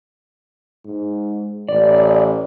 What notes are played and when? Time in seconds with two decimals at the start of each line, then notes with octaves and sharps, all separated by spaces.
0.85 G#2
1.69 A1 D5